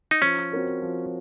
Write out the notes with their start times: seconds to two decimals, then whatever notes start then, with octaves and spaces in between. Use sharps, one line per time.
0.11 D#4
0.22 F3 C#4
0.52 C4 F#4 A#4 C#5
0.82 F3